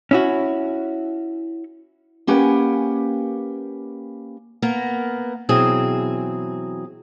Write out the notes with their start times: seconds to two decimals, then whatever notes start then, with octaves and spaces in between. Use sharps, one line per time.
0.11 C#4 E4 F#4
2.27 A#3 C#4 G4 B4 F#5 G#5
4.62 A#3 B3 A#4
5.49 B2 E3 F#3 C4 G#4